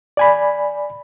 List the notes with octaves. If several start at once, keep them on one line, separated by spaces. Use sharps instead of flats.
D5 G#5 B5